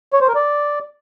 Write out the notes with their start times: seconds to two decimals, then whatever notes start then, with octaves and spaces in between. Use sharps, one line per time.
0.13 C#5
0.21 C5
0.28 A#4
0.35 D5